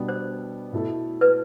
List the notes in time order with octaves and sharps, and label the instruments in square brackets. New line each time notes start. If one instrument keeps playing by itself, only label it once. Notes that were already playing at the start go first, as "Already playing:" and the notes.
Already playing: [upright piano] B2 G3 B3 D4
[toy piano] C5
[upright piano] B2 A3 E4 A4
[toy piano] B4